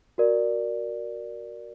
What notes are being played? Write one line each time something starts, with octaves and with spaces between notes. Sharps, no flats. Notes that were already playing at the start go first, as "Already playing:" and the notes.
F#4 A#4 D5